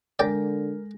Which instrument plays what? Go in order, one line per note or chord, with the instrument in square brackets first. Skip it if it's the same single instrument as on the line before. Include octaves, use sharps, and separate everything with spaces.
[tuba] D3 [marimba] G#3 A4 [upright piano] A#4 A#6 [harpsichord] D5 G5